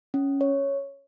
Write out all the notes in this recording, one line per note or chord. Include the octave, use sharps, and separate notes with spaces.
C#4
C#5